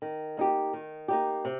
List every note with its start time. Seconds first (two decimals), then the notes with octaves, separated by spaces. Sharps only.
0.02 D#3
0.37 A#3 D#4 G4
0.73 D#3
1.08 A#3 D#4 G4
1.45 C3